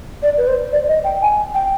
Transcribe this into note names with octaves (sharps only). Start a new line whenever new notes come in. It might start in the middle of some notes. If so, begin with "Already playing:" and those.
D5
B4
C5
D5
D#5
G5
G#5
G5